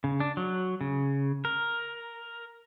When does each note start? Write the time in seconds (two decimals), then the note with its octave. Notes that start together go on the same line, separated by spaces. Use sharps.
0.04 C#3
0.20 D4
0.37 F#3
0.81 C#3
1.45 A#4